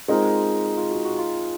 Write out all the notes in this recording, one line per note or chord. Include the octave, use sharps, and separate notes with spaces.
G#3 C4 D#4 F4 A#4
F4
F#4
F#4
F4